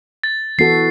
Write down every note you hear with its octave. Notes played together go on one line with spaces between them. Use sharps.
A6
E3 B3 F#4 A4 C7